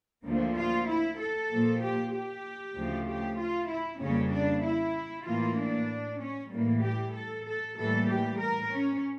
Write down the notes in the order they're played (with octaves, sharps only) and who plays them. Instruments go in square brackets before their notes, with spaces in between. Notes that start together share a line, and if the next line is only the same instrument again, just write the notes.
[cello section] D2 D3 F3 A#3
F4
E4
A4
A#2 F3 A#3
G4
G4
D2 C#3 F3 A3
G4
F4
E4
F2 C#3 G3 A#3 C#4
D4
E4
A2 E3 A#3 F4
D4
C#4
A2 E3 G3 A#3
G4
A4
A4
A2 E3 G3 A#3 A4
G4
A#4
C#4